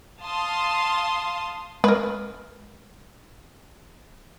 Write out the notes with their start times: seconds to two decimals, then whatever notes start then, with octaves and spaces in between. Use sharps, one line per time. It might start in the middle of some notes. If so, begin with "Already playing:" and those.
0.22 F5 A5 C6 D#6
1.84 G#3 A#4 B4